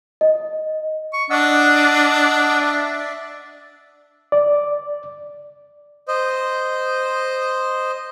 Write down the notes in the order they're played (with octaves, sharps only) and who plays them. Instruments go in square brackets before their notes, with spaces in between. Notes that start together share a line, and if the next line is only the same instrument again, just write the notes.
[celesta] D#5
[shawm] C#6
[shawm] D4 [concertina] D#5 F#5 E6
[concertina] D5 E5
[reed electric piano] D5
[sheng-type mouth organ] C5 D#5